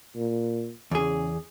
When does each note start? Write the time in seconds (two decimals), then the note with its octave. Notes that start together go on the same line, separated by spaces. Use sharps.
0.16 A#2
0.91 E2 C#3 G#4